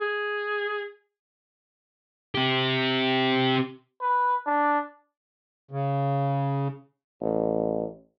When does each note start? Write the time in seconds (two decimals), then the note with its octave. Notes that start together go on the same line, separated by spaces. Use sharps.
0.01 G#4
2.35 C4 G4
4.02 B4
4.46 D4
5.71 C#3
7.21 A1